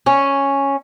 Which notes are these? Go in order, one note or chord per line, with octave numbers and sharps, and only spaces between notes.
C#4